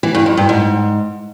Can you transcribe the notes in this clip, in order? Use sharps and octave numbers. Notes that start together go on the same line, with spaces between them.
E3
G2
F2
G2
G#2